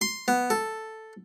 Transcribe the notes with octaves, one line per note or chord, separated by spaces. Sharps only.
C6
B3
A4